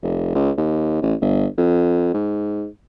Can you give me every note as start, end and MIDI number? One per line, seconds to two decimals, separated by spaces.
0.03 0.32 29
0.35 0.51 37
0.57 1.01 39
1.02 1.15 33
1.21 1.46 31
1.58 2.11 41
2.14 2.66 44